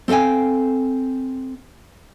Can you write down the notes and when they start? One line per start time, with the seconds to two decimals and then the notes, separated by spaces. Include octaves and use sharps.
0.08 C4 A4 F5 G5 G#5